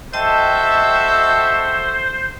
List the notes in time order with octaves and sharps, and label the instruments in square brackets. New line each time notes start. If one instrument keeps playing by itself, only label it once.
[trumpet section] F#4 A4 E5 [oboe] C5 [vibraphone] D#5 G5 A5